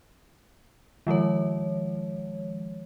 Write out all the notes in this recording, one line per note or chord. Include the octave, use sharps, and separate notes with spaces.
D#3 F3 G#3 C#5